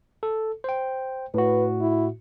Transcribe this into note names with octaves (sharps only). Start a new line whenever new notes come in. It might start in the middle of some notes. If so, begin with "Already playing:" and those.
A4
C5 G5
A2 F#4 B4
E4